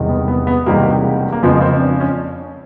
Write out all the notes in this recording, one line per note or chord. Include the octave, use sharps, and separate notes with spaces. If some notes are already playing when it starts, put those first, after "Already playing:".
Already playing: E1 E2 C3 D#3 G3
B3
B3
B3
E1 E2 C3 D#3 G3 A#3
A#3
F2 C#3 F3 G#3 B3
C4
D4
C#4